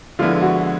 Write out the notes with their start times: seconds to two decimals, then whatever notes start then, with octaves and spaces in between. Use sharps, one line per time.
0.19 D3 F3 G#3 B3 E4 F4
0.42 F#4